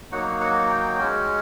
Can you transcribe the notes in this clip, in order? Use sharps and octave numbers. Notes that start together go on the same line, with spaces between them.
F#3 A#3 D#4 F#4 F#5
F#5
G5
G#3 C#4 F#4